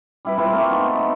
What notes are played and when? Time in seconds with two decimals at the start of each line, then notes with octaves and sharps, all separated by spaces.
0.25 G3 E4 B4
0.38 C4 F4 A4 B4
0.52 A3 A#3 F#4
0.70 B3 D#4 A4
1.00 B3